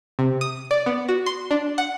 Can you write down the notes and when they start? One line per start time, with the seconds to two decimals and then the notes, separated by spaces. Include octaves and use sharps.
0.19 C3
0.41 D#6
0.71 D5
0.86 B3
1.08 F#4
1.26 C6
1.51 D4
1.78 F#5